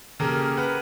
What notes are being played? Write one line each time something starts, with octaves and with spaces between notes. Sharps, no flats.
C#3 A#3 G4 A4 A#4
A#4 B4 F#5